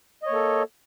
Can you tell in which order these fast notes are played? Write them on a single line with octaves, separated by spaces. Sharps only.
D#5 C#5 A#3 A4